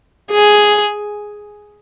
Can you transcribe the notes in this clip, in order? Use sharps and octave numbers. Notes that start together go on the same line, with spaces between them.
G#4